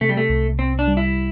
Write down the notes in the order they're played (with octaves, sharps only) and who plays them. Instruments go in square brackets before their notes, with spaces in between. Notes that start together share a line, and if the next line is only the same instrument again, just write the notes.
[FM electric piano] C3 [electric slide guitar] A3
[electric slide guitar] G3
A3
[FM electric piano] C2
[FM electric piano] C2 [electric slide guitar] C4
[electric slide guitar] D4
[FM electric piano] G3
[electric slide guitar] E4